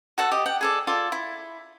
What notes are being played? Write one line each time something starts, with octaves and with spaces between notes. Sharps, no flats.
F#4 A4 F#5 A5
G4 D#5
F#5 G5
G#4 A4 D5
F4 A4 D5
E4